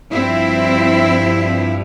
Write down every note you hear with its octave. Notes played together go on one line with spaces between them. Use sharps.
G2 F3 C4 E4